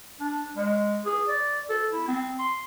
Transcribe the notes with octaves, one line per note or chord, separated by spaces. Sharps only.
D4
G#3
G#4
D5
A4
E4
C4
C6